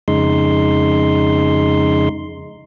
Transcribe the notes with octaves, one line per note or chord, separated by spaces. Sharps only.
F2 C#3 G#3 D#4 C6